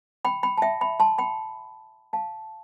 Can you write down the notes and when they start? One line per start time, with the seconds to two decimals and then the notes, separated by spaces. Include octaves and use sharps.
0.25 G5 B5
0.43 G5 B5
0.58 A5
0.62 E5 G5
0.81 G5 B5
1.00 A5 C6
1.18 G5 B5
2.13 F5 A5